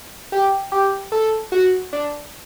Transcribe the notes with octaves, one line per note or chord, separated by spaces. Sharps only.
G4
G4
A4
F#4
D4